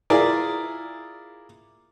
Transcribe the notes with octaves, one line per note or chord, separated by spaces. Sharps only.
E4 F4 G#4 A#4 D5